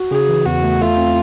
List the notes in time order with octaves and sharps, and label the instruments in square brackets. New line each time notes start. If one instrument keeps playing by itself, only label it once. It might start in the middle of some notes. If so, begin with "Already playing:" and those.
Already playing: [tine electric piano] F#4
[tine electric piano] C#3 [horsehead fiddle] G#4
[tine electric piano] E3
[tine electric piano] E2 [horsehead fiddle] F#4
[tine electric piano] A3
[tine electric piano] A3 [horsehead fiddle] F4
[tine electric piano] C4